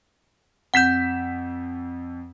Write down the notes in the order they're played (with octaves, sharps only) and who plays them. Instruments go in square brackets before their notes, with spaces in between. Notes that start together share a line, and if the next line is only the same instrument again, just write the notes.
[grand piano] F2 B6 E7 [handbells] F#5 G6